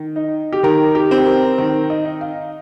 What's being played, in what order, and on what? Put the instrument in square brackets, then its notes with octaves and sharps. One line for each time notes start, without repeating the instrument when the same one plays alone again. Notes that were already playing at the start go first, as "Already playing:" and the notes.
Already playing: [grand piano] D#3
D#4
[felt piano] G4
[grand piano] D#3 [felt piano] A#4
[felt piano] G4
[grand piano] C4
[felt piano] A#4
[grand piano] D#3 [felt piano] A#4
[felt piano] D#5
[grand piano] D#4
[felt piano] F5